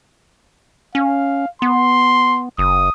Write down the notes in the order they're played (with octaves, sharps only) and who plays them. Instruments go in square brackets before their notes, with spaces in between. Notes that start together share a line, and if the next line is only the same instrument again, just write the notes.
[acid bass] C#4 [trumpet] F5
[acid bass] B3 [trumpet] C6
[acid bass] F#1 [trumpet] D#6